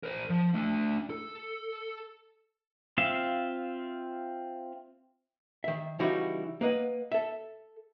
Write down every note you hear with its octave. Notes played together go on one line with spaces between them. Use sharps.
A#4 C5
F3
A3 D4
A4
C4 F4 E5 F5
D#3 E5
C#3 E3 G3 D#4 E4 F#4
A#3 B4 D#5 F#5
A4 E5